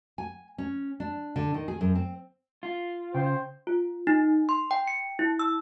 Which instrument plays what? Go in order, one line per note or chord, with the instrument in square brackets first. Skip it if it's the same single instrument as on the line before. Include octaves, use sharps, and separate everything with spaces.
[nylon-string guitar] G#5
C#4
D4
D3
D#3
G#4
F#2
C4
[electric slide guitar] F4
[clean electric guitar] C#3 G5 [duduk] C5
[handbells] F4
D#4
C6
G5
C#7
E4
E6